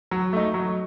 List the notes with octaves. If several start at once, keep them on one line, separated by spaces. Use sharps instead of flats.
F#3
A3 D#4
F#3